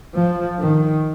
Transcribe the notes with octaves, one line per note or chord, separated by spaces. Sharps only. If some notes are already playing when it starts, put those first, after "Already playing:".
F3
D#3